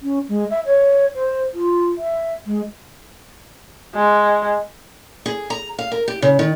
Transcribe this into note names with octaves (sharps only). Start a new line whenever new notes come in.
C#4
G#3
E5
C#5
C5
F4
E5
G#3
G#3
G#4
A#5
F5
A#4
G4
C#3
D#3